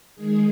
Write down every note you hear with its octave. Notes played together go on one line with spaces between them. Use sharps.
D#3 G#3 G#4